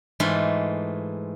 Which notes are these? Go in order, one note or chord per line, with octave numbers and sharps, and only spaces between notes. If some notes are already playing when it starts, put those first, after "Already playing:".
G#2 E3 A3 F4